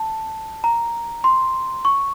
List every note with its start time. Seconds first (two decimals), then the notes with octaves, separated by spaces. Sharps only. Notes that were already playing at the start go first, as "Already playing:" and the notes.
Already playing: A5
0.64 A#5
1.24 C6
1.85 C#6